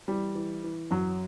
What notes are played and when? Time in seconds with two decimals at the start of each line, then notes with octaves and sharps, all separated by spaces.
0.08 E3 G3
0.35 E3
0.64 E3
0.91 F#2 F#3